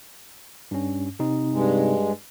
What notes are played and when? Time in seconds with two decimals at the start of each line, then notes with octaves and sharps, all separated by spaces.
0.71 G2 C#4
1.19 C3 C4 D#4
1.53 G2 G#3